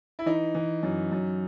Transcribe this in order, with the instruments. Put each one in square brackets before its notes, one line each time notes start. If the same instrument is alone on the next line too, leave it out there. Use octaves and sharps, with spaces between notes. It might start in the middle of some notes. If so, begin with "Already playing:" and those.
[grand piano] E4
E3 D#4
E3
F#2
F#2